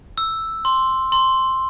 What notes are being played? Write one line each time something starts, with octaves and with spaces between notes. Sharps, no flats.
E6
C6
C6